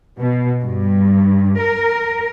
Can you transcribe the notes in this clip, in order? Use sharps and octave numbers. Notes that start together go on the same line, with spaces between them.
B2
G2
A#4